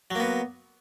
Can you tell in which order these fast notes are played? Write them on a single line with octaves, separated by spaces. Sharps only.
F#3 A#3 B3